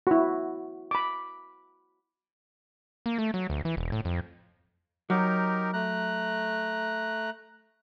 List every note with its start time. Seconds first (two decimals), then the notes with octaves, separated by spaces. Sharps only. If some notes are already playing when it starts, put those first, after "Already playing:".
0.07 E4 F#4
0.91 B5 D6
3.06 A#3
3.18 A3
3.34 F#3
3.50 D2
3.65 E3
3.77 E1
3.92 A2
4.05 F2
5.10 F#3 D#4 G4 A#4
5.73 A3 A#5 F#6